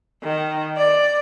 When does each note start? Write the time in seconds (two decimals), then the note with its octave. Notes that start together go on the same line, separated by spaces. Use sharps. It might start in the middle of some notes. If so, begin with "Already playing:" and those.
0.24 D#3
0.77 D5